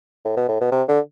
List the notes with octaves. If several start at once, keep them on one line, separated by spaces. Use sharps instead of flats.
A2
B2
A2
B2
C3
D3